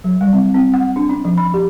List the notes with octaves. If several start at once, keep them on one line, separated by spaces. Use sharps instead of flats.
F#3
G3
C4
C4
F#5
D4
C#4
F3
B5
G4